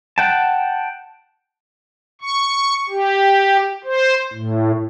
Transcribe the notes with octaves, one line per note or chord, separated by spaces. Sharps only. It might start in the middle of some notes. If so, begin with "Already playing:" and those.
F#5 G5 A5
C#6
G4
C5
A2